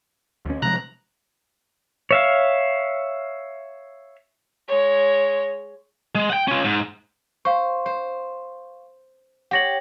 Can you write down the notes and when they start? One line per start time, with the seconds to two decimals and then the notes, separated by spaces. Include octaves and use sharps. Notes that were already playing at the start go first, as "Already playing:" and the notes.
0.45 D2 C#4
0.62 C3 F3 G#3 A#5 F#6
2.11 C#5 E5 F5
4.68 G#3 C#5
6.15 G#3
6.30 F#5 G5
6.48 C#4 F4
6.64 G#2
7.45 C5 F5 C#6
7.86 C5
9.51 G4 C#5 F#5 A#6 F#7